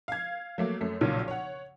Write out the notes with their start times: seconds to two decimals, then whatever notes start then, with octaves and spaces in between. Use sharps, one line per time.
0.08 F5 G#6
0.58 F#3 A3 A#3
0.81 F#2 A3
1.01 B1 A#2 C#3 F3 F#3
1.28 C#5 F#5